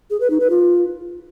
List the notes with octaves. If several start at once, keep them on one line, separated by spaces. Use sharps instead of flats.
G#4
B4
D#4
B4
F4